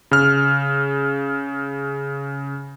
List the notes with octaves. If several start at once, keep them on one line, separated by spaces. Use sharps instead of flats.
C#3 F6